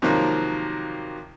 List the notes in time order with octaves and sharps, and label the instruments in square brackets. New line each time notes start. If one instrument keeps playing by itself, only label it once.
[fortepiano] C3 D#3 F3 F#3 A#3